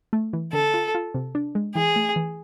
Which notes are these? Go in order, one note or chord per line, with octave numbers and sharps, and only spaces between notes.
A3
E3
D3 A4
F4
F4
C3
D4
G#3
E3 G#4
A3
E3